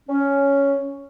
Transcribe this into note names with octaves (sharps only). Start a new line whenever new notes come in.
C#4